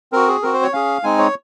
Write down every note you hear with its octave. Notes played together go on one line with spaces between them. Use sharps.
C4 F#4 A#4
G#4
C4 F#4 A#4
C5
C#5
C#4 G#4 F5
G#3 C4 D#4 G#5
C#5